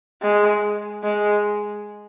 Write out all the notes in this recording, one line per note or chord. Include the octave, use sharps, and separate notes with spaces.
G#3
G#3